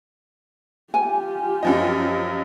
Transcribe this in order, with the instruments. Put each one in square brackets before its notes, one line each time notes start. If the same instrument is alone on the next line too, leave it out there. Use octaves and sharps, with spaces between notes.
[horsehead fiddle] F4 G4 [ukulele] G#5
[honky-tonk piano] F#2 F3 D#4